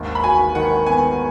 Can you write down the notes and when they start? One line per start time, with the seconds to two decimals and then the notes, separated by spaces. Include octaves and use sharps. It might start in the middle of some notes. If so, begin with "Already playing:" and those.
Already playing: G#1 D#2
0.15 B5
0.23 F#4 G#5
0.55 D#3 F#5
0.86 B3 G#5